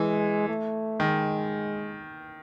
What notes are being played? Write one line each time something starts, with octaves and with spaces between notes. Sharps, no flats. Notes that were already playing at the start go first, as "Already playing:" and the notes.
Already playing: E3 G#3
A3
D#3 G#3